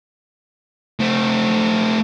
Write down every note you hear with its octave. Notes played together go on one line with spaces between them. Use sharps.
A3 C4